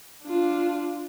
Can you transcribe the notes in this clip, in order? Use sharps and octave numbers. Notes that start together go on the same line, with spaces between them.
D4 F4